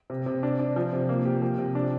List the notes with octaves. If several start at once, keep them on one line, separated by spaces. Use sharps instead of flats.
C3
C3
D4
D4
F3
C3
A#3
G4
F3
C3
D4